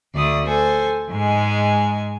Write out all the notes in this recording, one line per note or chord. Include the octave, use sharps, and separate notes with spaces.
D2 A3 D5 D#6
A4 C5 G#5
G#2 G#3 G#5